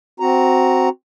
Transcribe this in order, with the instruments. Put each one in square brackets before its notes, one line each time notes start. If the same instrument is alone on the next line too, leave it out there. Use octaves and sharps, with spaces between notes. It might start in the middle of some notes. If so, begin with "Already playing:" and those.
[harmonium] C4 F#4 A#5